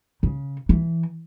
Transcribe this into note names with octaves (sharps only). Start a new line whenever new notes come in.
C#3
E3